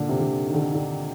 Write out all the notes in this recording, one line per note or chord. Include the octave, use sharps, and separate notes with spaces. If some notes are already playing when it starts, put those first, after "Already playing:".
Already playing: A#2 D3
C3
D3
D#3
D3
D#3
D3